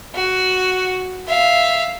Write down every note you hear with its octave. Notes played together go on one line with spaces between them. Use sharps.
F#4
E5 F5